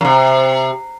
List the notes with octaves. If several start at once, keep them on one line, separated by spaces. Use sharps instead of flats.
F#2 C3